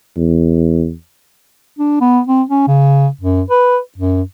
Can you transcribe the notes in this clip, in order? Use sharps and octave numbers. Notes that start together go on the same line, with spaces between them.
E2
D4
B3
C4
C#4
C#3
F#2
B4
F#2